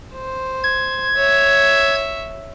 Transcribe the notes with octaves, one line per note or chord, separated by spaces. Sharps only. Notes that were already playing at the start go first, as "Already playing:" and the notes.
C5
G#6
C#5 E5